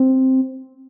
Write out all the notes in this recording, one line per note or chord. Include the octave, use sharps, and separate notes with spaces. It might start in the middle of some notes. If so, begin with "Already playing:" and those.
Already playing: C4